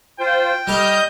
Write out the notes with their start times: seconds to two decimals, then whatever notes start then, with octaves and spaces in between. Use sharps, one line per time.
0.20 F4 C5 G5
0.67 G3 A4 D#5 F6 G6